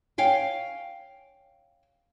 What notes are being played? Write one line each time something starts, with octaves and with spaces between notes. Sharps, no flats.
C#5 F5 G5 G#5